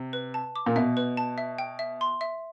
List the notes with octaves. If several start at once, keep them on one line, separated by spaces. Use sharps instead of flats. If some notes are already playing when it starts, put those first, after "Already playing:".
Already playing: C3
B4
A5
D6
A#2
B2 E5
B4
A5
E5
G5
E5
C6
E5